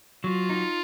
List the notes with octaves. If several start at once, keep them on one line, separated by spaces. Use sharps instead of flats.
F#3 F4
D#4